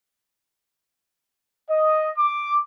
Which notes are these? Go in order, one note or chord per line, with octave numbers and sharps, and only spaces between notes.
D#5
D6